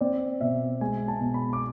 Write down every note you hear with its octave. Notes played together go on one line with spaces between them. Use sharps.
C4 D5
B2 E5
G#3 G#5
A5
B2
B5
D6